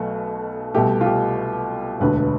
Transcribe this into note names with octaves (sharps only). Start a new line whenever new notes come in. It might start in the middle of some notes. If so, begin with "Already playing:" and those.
Already playing: B1 B2 A3
C2 B2 A3 G4
F4
G4
E1 D2 D3 B4
B4